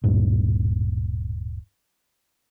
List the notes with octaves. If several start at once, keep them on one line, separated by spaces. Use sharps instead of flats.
D1 G2 A#2